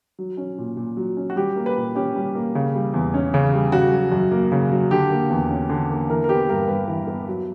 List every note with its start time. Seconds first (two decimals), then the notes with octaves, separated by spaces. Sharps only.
0.19 F#3
0.37 C#4
0.58 A#2
0.77 A#2
0.97 F#3
1.17 C#4
1.30 F#4
1.36 G3 G4
1.56 A#3
1.66 B4
1.76 A#2
1.95 C#4 G4
2.16 G3
2.35 A#3
2.55 C#3
2.75 G3
2.93 E2
3.14 C#4
3.34 C#3
3.54 G3
3.72 C#3 F#4
3.92 F#3
4.12 F#2
4.32 A#3
4.52 C#3
4.71 F#3
4.91 D3 G4
5.10 A#3
5.30 E2
5.50 C#4
5.69 D3
5.90 A#3
6.09 E3 A#4
6.24 A#4
6.29 B3 G4
6.49 G2 A#4
6.68 G2 B4
6.88 E3
7.07 B3
7.28 F#3